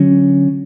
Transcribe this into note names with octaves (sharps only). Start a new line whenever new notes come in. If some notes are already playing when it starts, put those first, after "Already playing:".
Already playing: D3 F#3 C#4